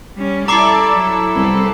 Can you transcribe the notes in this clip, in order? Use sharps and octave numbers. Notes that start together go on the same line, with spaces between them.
G3 C#4
E4 A4 D5 A#5 D6 C7
F#3
C2 B3 C4